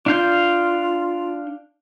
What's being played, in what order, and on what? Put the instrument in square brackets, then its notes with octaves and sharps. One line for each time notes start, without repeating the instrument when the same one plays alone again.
[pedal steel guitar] D4 F5 G6 [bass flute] F4